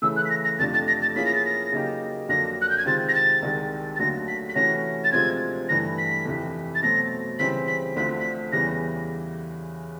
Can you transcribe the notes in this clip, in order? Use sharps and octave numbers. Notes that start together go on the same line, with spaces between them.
C#3 E3 A3 E6
F#6
B6
A#6
A#6
F2 C3 F3 A3 D4 A6
A6
A#6
A6
F3 A#3 C#4 E4 G#4 B6
A#6
A6
A#6
C#3 F#3 A#3 D#4 G4
F2 D3 F#3 A#3 D4 A#6
F#6
G6
G#6
C3 D#3 G#3 C4 F4 A6
A#6
A6
C2 C3 D#3 G#3
A6
D#2 D3 F#3 A3 A#6
B6
B6
C3 E3 A3 C#4 F#4 A#6
A6
D2 C3 F3 G#3 C4 G#6
G2 E3 A3 A#6
B6
F2 C3 E3
A6
B2 F#3 A3 C4 A#6
C#2 C#3 E3 G3 C4 B6
B6
D2 D3 F3 A3 C4 B6
B6
E2 C#3 E3 G3 A#6